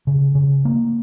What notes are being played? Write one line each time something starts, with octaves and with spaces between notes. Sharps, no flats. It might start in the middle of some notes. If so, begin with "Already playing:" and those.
C#3
C#3
A#3